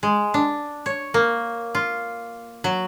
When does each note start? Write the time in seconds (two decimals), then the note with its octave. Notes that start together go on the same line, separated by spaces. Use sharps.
0.03 G#3
0.34 D4
0.86 C#5
1.14 A#3
1.75 F4
2.64 F#3